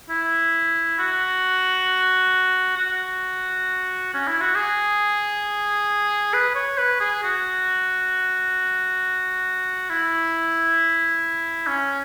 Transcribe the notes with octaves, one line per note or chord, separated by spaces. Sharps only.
E4
F#4
F#4
C#4
E4
F#4
G#4
B4
C#5
B4
G#4
F#4
E4
C#4